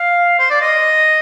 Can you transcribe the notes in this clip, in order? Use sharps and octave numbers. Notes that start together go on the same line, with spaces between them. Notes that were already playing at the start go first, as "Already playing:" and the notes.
Already playing: F5
C5
D5
D#5